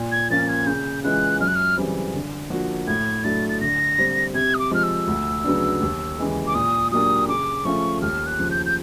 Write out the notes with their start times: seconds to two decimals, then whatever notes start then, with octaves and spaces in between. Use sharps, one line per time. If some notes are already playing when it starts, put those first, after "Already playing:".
Already playing: A#2
0.12 G#6
0.30 F3 A#3 C#4 F4 A6
0.48 G#6
0.67 C#3 G6
1.03 E3 G#3 C#4 F4 F#6
1.40 F#2 F6
1.48 F#6
1.55 F6
1.77 C#3 E3 G3 C4
2.13 D3
2.50 F3 A#3 D4 F#4
2.87 A2 G#6
3.24 F#3 A3 D4 A6
3.49 A6
3.61 D3 A#6
3.98 G3 C4
4.34 C3 G#6
4.54 D#6
4.59 D6
4.71 F3 G#3 F6
4.83 E6
5.07 D2
5.44 C#3 F#3 B3 D4
5.82 D#2
6.18 C#3 E3 G#3
6.47 D6
6.55 A#2 D#6
6.92 F#3 A#3 D4 G4 D#6
7.28 C#3 D6
7.65 F3 A3 C#4 F4 C#6
8.02 D#2 F6
8.26 F#6
8.39 C#3 F3
8.51 G6
8.66 G6